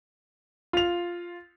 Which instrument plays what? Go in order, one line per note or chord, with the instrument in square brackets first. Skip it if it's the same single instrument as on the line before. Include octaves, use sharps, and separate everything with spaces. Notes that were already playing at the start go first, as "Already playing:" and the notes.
[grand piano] F4 F7